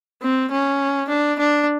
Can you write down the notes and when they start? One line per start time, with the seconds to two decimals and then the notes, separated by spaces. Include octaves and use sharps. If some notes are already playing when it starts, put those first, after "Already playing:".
0.22 C4
0.51 C#4
1.09 D4
1.39 D4